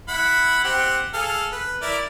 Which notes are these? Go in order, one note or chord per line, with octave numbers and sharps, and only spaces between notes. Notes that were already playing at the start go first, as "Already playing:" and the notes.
E4 F#5 B5
C4 G4 F#5
G#4 A4 F5
B4
E4 A#4 D5